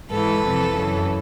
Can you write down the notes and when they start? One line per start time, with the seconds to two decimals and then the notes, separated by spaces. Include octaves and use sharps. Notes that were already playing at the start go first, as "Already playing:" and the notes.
0.11 G#2 E3 A4 B4
0.44 F2 C3 E3
0.76 F#2 C#3 E3